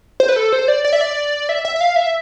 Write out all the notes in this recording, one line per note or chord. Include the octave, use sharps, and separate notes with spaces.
C5
B4
A4
C5
D5
D5
E5
D5
E5
E5
E5
F5
E5